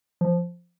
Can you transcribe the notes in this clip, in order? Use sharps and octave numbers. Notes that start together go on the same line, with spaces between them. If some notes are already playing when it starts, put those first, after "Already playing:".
F3